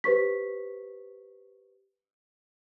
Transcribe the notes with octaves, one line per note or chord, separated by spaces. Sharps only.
G4 B4 C5 C#6 B6